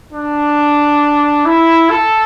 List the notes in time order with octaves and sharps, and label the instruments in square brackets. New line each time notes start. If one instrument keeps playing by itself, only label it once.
[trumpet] D4
E4
A4